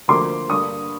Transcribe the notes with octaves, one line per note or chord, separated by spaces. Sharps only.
D2 D3 F3 A#3 C6 D6
G2 D3 G3 A#3 C#6 D#6